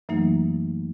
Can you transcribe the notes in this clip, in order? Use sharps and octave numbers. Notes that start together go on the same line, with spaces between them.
F#2 E3 F#3 A3 A#3 D#4